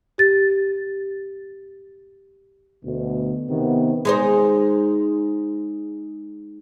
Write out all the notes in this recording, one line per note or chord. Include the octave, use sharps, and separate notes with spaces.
G4 A6
D2 B2
C3 D#3 B3
G#3 D#4 C5